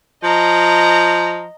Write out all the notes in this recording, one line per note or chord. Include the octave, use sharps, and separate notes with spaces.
F3 D#5 A#5